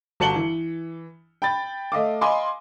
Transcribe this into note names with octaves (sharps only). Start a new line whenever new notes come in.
G1 F#4 A5 C#7 F#7 G7
E3
G5 B5 A6
A3 D#5 F5 D6
D#5 F5 G#5 B5 C6 D6